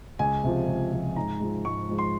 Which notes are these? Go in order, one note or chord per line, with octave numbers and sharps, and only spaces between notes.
C#2 G#5
C3 F3
C#2
C3 F3
G#2 A#5
F3 G#3
G#2 C#6
F3 G#3
C6